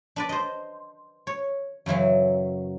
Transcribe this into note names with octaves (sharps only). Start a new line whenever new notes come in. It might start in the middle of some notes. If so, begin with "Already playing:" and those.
D4 B4 D5
C5 D#5
C#5
F#2 C#3 E3 F#3